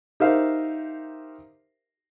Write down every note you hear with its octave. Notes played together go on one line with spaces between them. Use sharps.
D#4 G4 A#4 C5 E5 F5